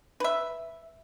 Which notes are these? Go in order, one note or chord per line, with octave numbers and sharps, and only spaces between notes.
B4 E5